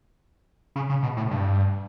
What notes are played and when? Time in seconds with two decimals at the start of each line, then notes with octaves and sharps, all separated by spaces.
0.76 C#3
0.89 C#3
1.03 B2
1.17 A2
1.31 G2